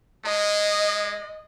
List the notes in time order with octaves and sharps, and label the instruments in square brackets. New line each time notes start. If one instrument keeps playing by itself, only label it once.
[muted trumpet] G#3 [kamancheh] D#5